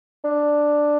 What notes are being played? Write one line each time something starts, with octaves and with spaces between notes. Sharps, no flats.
D4